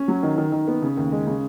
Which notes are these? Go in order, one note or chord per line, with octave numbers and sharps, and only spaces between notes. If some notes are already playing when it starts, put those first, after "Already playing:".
Already playing: C#4
F#3
D#3
D#3
D#3
B3
C#3
D#2
G#3
C#3